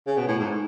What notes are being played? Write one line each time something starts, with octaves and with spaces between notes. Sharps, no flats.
C#3
B2
A2
G#2